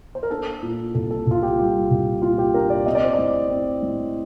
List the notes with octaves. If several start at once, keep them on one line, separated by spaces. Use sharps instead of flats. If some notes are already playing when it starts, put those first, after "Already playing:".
C5
A#4
D4 A4
A#2
C2 A4
A4
C2 F4
G4
G3 F4
C2
A#2 F4
G4
D4 A#4
D5
C4 D#5
D5
C5
A2 D5
C4
A2